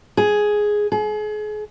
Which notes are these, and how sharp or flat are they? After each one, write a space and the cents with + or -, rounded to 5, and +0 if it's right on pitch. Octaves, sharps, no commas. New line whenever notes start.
G#4 +5
G#4 +35